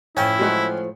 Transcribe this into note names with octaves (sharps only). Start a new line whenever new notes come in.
A2 F3 C#4 E4 G5
F#3 G#3 F#4